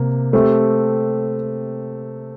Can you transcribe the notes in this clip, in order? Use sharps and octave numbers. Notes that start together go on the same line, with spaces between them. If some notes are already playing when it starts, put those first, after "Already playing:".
Already playing: C3 A#3
A3 C4 G4